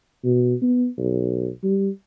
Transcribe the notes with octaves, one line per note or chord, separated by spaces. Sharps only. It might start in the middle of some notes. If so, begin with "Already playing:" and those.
B2
B3
B1
G3